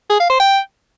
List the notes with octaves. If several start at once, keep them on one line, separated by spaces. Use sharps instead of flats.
G#4
F5
C5
G5